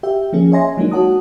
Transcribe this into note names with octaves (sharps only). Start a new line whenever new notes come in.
G4 E5 G5
F3 A#3 C#4 G#4
C#5 D#5 E5 G#5 C6 A#6
F#3 G#3 A#3 D4 D#4
F#4 C#5 F#5 A5 D#6